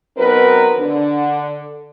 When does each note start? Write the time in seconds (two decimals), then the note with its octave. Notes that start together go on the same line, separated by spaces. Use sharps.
0.17 F#3 B3 C4 D#4 A#4 B4
0.79 D3